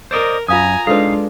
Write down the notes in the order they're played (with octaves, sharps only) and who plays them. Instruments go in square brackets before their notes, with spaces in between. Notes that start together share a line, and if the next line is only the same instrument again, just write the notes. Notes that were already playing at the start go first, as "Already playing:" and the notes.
[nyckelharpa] A#4 [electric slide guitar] C5 D5 D#5
[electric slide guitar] F#2 [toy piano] F4 F5 D#6 [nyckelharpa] G#5 A#5
[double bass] G#3 D4 [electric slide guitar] D#4 F5 [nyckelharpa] F4 [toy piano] A4 B4